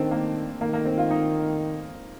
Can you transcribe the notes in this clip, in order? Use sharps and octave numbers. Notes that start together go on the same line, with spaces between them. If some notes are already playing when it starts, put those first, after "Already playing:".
Already playing: D#3 C4 D4
A#3
D#3 A#3
A#3
C4
F4
D#4